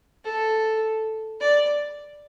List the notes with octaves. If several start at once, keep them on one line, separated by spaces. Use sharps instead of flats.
A4
D5